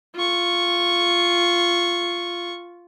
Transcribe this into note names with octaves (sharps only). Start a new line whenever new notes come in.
F4 C#6